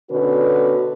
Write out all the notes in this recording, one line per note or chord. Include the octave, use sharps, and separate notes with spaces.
B2 D3 C#4 F#4 B4